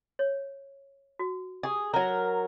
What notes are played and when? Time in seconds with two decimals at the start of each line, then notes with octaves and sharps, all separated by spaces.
0.19 C#5
1.19 F#4
1.63 G4 G#4 D#6
1.94 F#3 A#4 A#5